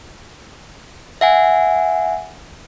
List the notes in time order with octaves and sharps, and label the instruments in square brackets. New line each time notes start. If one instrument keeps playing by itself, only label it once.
[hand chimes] E5 F#5 G#5